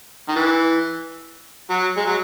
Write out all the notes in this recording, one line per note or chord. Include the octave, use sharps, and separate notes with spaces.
D#3
E3
F#3
G#3
F#3